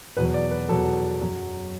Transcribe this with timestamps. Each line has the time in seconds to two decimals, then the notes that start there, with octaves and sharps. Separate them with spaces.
0.17 E2 B2 F#3 B4
0.34 D5
0.51 B4
0.69 E2 B2 F#3 A4
1.21 F#2 F#3